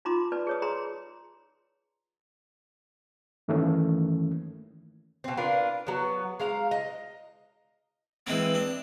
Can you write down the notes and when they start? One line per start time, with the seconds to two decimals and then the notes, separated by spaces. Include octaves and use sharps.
0.05 D#4 F4 A#5 C6 D6
0.32 B4 D5 A5
0.47 G#4 C#5 D#6
0.62 G#4 A#5 C6
3.48 G2 D#3 E3 A3 A#3 C#4
5.24 B2 C4
5.37 D4 F4 A#4 B4
5.87 F#3 B3
6.40 G#3 F5 A#5
6.71 D#5
8.27 E3 G#3 A#3 C4
8.54 D4